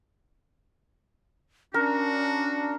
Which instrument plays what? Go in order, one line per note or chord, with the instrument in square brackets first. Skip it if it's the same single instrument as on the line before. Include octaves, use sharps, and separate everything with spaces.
[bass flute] C#4 [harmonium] D4 [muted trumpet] F#4 [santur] A#4